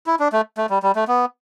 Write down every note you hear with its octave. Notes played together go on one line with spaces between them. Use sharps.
E4
D4
A3
A3
G3
G3
A3
B3